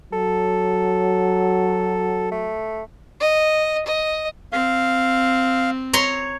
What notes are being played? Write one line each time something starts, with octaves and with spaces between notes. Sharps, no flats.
F#3 A4
A3
D#5
D#5
C4 F5
C#5 A#5 C6